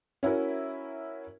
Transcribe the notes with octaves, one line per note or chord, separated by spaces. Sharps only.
C#4 E4 F#4 A#4